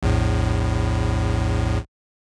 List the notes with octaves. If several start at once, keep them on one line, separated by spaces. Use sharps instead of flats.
A#1 E2 A2